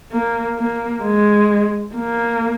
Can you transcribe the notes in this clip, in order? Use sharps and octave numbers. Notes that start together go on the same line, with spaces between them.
A#3
A#3
G#3
A#3